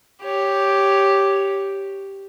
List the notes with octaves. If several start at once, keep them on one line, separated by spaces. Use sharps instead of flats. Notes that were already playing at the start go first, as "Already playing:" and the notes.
G4 C#5